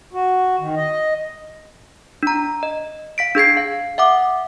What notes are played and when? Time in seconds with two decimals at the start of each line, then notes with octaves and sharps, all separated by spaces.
0.13 F#4
0.60 D#3
0.76 D#5
2.23 D4 A#5
2.63 D#5
3.18 F5 B6 D7
3.35 D4 G#4 G#6 C7
3.57 F5
3.98 E5 F#5 D6 D#6